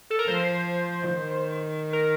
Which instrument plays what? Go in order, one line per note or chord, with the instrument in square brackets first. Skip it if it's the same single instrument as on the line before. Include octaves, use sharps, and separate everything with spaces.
[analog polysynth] A4
A#4
[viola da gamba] F3 [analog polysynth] C5
[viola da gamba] D#3
[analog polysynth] A#4